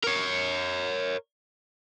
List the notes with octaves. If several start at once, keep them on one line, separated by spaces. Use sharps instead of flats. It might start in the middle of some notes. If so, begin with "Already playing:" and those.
A#4 C#5